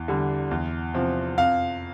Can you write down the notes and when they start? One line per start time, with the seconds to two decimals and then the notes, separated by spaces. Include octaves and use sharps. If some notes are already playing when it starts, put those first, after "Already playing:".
Already playing: E2
0.08 D3 G3
0.51 E2
0.94 C3 F3
1.37 F2 F5